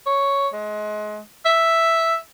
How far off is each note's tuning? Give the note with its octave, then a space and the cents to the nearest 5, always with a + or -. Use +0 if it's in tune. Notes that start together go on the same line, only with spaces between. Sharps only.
C#5 +5
G#3 +30
E5 +0